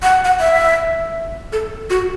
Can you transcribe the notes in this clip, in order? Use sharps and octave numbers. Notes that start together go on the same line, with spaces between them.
F#5
F#5
E5
A4
F#4